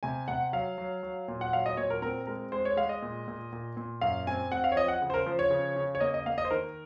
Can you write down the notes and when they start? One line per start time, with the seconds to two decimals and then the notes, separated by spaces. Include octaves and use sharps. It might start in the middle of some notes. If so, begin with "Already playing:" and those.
0.03 C3 G#5
0.28 C3 F#5
0.53 F#3 F5
0.78 F#3
1.03 F#3
1.28 A#2
1.41 F#5
1.53 F#3 F5
1.66 D#5
1.77 A#2 C#5
1.90 A#4
2.02 C4 A#4
2.27 G#3 A#4
2.52 G#3 C5
2.65 C#5
2.77 G#3 F5
2.89 D#5
3.02 A#2
3.28 A#2
3.53 A#2
3.77 A#2
4.01 F#2 F5
4.27 C4 G#5
4.52 C4 F#5
4.64 F5
4.72 C#5
4.76 F3 D#5
4.88 F#5
5.02 C#3
5.10 C5
5.14 A#4
5.26 F3 C5
5.39 C#5
5.51 C#3
5.76 C#3
5.95 C#5
6.00 A#3 D#5
6.14 D#5
6.26 A#3 F5
6.38 D#5
6.45 C5
6.50 D#3 A#4